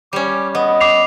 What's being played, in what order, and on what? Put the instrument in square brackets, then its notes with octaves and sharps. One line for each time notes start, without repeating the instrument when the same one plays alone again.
[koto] G3 C#4 [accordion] D6
[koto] B3 [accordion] D#5
[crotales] D6 C7 F7